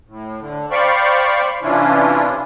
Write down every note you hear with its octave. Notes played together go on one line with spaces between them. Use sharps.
A2
D3
C5 D5 F5 G5 B5 C#6
C3 E3 C#4 D4 E4 F4